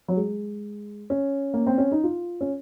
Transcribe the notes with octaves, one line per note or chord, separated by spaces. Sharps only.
F#3
G#3
C#4
A#3
C4
C#4
D#4
F4
C#4